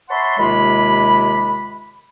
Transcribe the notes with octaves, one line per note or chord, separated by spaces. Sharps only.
C#5 E5 F#5 A5 B5 C6
D#2 C3 G#3 F4 B5